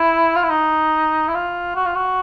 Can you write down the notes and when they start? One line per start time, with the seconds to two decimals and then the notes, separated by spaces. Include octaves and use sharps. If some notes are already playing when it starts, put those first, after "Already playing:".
Already playing: E4
0.36 F4
0.43 E4
0.49 D#4
1.28 E4
1.35 F4
1.76 F#4
1.86 F4
1.95 F#4